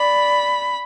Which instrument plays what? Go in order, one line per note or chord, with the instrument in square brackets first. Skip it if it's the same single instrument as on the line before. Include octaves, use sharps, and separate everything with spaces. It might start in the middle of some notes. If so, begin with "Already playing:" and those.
Already playing: [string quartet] D5 [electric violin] B5